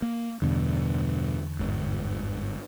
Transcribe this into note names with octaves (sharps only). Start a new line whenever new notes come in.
A#3
E2 G2 B2 D3
G1 G#2